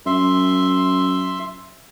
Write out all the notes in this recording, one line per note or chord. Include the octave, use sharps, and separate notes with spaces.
F#2 E5 C6